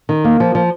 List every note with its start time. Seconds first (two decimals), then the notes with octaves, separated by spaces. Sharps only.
0.09 D#3
0.24 A#3
0.40 F3
0.55 F3